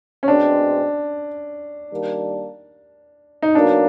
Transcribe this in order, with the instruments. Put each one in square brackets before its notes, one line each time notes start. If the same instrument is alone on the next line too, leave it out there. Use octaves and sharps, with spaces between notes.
[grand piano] C#4
[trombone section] B2 G#3 C4 [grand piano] D4
[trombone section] D#3 G3 A#3 D4
[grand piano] D#4
[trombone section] B2 F#3 A#3 [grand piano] D4